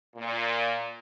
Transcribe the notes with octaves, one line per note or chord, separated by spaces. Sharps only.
A#2